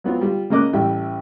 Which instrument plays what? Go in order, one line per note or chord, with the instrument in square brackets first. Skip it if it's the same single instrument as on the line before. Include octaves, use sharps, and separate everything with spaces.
[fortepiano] F#3 B3 C4 F4
G3 F4
C#3 A#3 D#5 D6 F#6
A1 G3 E5 G5